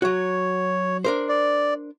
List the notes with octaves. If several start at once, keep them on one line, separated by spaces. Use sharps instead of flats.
F#3 F#4 C#5
D4 A#4 C5
D5